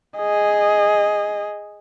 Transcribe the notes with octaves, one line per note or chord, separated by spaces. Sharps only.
G#4 D#5